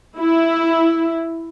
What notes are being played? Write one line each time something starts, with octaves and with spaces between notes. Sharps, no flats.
E4